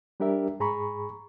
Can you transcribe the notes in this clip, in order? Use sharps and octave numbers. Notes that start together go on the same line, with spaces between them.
G3 D4 G4 A#4 E5
G#2 G#4 A#5 B5 C#6